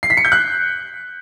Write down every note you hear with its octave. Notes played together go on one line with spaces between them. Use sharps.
C7
B6
C#7
G6
F#6